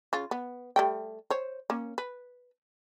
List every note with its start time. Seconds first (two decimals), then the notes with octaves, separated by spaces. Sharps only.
0.13 C#3 F4
0.31 B3
0.76 G3 A3 G5
1.30 C5 C#5
1.70 A#3 C#4
1.98 B4